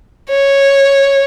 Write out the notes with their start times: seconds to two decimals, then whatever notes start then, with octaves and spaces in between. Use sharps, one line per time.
0.30 C#5